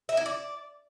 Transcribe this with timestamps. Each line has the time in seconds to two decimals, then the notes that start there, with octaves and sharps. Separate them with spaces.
0.09 E5
0.17 E4
0.26 D5